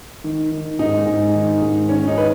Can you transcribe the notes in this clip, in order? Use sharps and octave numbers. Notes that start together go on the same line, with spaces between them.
D#3
D#3
G#2 D#4
G#2
D#3
G#2
D#3 C#4
D#4
D#3 B4